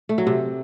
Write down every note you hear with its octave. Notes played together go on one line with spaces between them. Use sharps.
A3
F#3
C3